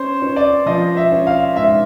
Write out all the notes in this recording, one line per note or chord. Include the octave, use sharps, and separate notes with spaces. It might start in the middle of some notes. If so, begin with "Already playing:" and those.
Already playing: C#4 C5
C#4
D5
F3 D#5
E5
C#4
F5
G#2 E5